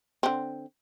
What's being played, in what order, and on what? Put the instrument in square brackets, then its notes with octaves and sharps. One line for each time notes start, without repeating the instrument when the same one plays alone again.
[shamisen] D3 C4